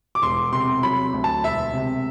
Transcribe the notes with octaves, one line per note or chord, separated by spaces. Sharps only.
D6
E1 C6
C3 C6
F#3 B5
D2
A5
E1 E5
C3